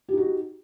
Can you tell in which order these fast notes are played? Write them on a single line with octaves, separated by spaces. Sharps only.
G4 D#4 F#4